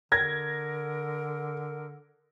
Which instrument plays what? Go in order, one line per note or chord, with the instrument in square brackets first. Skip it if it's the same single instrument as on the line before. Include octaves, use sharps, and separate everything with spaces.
[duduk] D3 [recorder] A#4 [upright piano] G#6 A#6